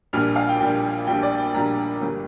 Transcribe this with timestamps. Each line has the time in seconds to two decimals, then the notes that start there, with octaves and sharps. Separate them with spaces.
0.13 A#1 A#2 G3 D4 F6
0.36 F5
0.49 G5
0.60 A#1 A#2 G3 D4 G5
1.07 A#1 A#2 G3 D4 G5
1.23 D5
1.38 G5
1.54 A#1 A#2 G3 D4 A#5
2.01 G1 G2 G3 A#3